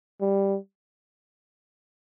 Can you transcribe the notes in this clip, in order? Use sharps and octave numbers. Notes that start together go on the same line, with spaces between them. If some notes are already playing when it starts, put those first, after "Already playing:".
G3